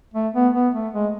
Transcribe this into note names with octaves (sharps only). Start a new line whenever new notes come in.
A3
B3
B3
A3
G#3